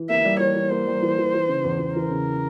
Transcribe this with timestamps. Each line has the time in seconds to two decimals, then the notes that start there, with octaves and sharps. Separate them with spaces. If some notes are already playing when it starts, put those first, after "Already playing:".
Already playing: E3
0.09 A#3 E5
0.25 G3
0.40 E3 C#5
0.55 E3
0.71 A#3 C5
0.87 G3
1.02 E3
1.18 E3
1.34 E3
1.48 C#3
1.64 E2
1.80 E2
1.95 E3 A#4
2.11 C#3